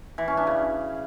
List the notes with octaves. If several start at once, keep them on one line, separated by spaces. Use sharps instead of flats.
E3
C#4
D4
C#3